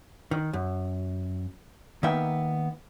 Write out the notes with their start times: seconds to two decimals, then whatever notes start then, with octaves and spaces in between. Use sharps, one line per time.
0.31 D#3
0.53 F#2
2.03 D#3 A#3 B3 E5 G5